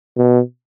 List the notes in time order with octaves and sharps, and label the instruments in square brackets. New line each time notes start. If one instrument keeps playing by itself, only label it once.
[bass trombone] B2